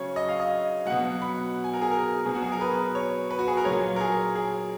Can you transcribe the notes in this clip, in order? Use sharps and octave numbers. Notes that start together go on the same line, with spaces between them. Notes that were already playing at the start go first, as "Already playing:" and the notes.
Already playing: C#3 F#3 C#5
D#5
F5
D#5
B2 F#3 F#5
B5
G#5
A#4
G#4
A#4
B2 F#3 G#4
F#4
G#4
A#4
B4
C#5
B4
F#4
G#4
A#4
A#2 F#3 C#5
A#4
G#4
G#4